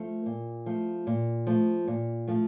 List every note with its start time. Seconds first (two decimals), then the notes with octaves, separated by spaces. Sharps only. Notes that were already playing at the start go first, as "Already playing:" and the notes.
Already playing: F3 A3
0.26 A#2
0.66 F3 A3
1.07 A#2
1.47 F3 A3
1.88 A#2
2.27 F3 A3